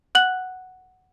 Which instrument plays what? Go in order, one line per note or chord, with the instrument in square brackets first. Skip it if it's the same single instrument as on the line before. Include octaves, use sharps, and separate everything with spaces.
[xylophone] F#5 F#6 F#7